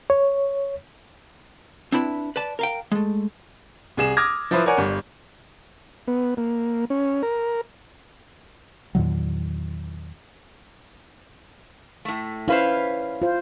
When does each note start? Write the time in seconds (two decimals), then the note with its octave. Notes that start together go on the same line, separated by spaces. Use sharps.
0.10 C#5
1.92 C4 D4 E4 B4 E5
2.36 B4 D5 A5
2.59 A#4 F5 G5
2.92 G#3 A3
3.97 C2 G#4 E7
4.17 D6 D#6 F6 G#6 A#6
4.51 F3 E4 B4 C5
4.66 A#4 C#5 D5 F#5 G#5
4.78 G1 G3
6.08 B3
6.37 A#3
6.90 C#4
7.23 A#4
8.95 E2 A#2 D#3 F#3
12.05 A2 A3
12.48 C#4 E4 B4 C5 F5
13.22 F4 C5